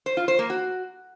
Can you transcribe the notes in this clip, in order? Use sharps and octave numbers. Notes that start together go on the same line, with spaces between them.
C5
F4
C5
A#3
F#4